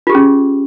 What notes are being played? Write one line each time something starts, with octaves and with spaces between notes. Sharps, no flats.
C#4 F4 G4 G#4